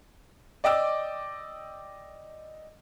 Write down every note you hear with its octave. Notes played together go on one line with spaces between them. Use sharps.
D5 D#5 G5 D6 E6